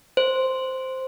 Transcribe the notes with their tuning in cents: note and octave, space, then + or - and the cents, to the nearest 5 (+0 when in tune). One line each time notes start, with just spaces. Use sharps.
C5 -5